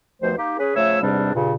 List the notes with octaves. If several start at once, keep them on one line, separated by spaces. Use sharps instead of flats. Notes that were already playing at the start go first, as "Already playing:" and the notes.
D#2 B2 F3 A3 C5
A#3 D#4 G4
C#4 G#4 B4
C#3 F3 A3 C#5 E5 E6
E2 G#2 C3 G3 C4 D4
G2 A#2 C#3